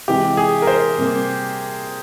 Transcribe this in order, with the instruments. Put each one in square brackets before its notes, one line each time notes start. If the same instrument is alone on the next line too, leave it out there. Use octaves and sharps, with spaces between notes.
[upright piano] C3 E3 G#3 E4 [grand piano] G4
[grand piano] G#4
A#4
C5
[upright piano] C3 G3 A#3